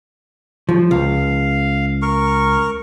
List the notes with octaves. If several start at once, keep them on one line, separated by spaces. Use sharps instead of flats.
F3
C#2 F5
A#4 C#6